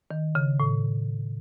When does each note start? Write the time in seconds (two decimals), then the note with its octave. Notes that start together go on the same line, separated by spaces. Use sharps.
0.11 D#3
0.35 C#3
0.60 A2